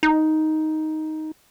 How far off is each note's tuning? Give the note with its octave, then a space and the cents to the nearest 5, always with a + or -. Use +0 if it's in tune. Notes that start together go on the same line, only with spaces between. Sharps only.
D#4 +5